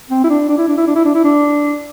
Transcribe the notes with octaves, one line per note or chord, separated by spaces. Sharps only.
C4
E4
D4
D4
E4
D4
E4
D4
E4
D4
E4
D4